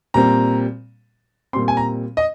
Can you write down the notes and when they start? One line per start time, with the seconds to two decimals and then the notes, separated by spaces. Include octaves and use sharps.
0.14 A#2 G3 C4 A#5
1.53 A#2 G3 C4 C6
1.68 G#5
1.77 A#5
2.17 D#5